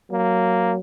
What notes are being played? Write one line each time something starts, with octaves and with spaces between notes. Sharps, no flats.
F#3 A#3